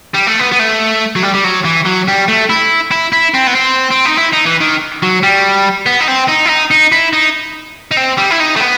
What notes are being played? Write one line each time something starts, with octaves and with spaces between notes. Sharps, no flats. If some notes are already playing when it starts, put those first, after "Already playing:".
G3
A3
B3
B3
A3
F#3
G3
G3
F#3
E3
F#3
G3
A3
E4
E4
E4
C4
B3
C4
C4
D#4
E4
D#4
E3
D#3
F#3
G3
B3
D#4
C4
D#4
E4
D#4
D#4
E4
D#4
D#4
C4
G3
E4
D#4
A3
B3